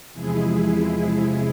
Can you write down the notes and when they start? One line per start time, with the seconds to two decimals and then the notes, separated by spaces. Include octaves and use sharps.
0.13 E2 C3 F3 G#3 E4 G#4
0.97 E4